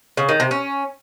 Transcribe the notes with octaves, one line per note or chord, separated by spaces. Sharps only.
C#3
D#3
C3
C#4